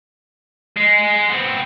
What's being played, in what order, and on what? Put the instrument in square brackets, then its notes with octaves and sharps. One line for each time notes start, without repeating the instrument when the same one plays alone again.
[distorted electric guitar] G#3
B3 C4